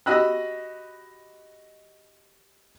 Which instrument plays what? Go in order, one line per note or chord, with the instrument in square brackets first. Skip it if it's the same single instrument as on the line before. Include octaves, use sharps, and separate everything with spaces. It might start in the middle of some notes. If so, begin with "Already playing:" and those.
[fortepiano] F#4 G4 D#5 B5 E6 F#6